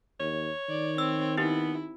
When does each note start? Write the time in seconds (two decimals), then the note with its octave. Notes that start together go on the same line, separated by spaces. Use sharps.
0.20 D#2 C#5
0.69 D#3 D5
0.98 C4 E6
1.38 B3 D#4 E4 G4